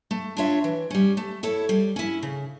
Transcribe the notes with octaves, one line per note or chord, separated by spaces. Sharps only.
A3
D4 F4 C#5 E5
E3
G3 C#4
A3
E4 A4 C#5
G3
C#4 E4
C#3